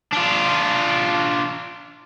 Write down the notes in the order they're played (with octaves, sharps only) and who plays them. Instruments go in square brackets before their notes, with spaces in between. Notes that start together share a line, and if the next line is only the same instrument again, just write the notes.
[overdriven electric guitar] D4 F4